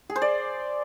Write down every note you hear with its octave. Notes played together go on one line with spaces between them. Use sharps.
G#4
C5
D5